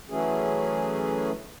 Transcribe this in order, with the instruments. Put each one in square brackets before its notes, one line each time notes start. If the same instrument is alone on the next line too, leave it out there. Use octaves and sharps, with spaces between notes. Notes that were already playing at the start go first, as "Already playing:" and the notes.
[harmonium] E3 F#3 A3 C#4 G#4